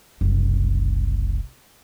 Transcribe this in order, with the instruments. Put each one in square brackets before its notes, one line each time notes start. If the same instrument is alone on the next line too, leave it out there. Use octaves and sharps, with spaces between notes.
[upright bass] F#1 C2